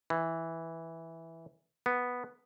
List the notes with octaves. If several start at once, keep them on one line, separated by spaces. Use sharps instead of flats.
E3
B3